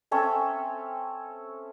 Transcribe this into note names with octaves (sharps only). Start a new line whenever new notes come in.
C4 C#4 A4 E5